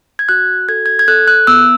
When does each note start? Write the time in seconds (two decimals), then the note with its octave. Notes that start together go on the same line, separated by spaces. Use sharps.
0.19 G#6
0.29 F#4 F#6
0.69 A4 G#6
0.86 G#6
0.99 G#6
1.08 A4 F#6
1.28 F#6
1.47 B3 E6